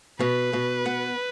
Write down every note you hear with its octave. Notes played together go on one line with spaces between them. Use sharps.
B2 B4
B2
B3